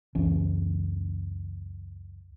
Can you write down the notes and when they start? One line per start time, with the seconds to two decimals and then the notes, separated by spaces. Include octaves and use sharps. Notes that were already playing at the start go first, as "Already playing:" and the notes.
0.15 C#2 F#2 E3 C#4